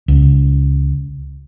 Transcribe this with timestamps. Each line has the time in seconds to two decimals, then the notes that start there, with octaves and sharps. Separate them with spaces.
0.08 C#2